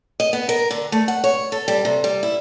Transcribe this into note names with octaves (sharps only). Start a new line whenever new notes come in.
D#5
B3
A#4
D3
A3
F#5
C#5
A4
G3
C3
G3
E4